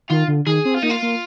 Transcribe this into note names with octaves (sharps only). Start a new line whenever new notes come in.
D#3 F4
D3
D#3 G#4
C4
F4
A#3 D#4
F4
A#3